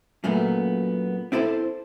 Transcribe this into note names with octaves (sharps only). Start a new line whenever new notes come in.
F#2 A#2 A3 B3
C4 E4 A4 B4 C5